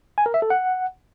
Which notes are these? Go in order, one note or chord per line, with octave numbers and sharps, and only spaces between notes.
G#5
A#4
E5
A4
F#5